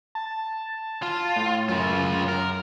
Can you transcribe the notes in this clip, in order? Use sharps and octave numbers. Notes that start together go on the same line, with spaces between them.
A5
F4
A2
F#2 C#3 F4
A#4